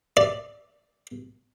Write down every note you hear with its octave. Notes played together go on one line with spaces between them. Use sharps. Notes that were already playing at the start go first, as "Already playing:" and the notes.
D5